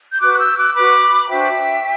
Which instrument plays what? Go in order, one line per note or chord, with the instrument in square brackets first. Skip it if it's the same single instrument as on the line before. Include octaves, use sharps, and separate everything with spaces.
[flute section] G6
F#4 B4 D6 F#6
F#6
E6 G6
D6 F#6
F#4 B4 B5 D6
D4 F#4 C5 E5 G5